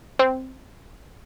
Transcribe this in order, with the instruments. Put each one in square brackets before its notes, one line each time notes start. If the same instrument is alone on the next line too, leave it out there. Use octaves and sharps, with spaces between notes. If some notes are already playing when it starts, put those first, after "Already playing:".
[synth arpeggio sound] C4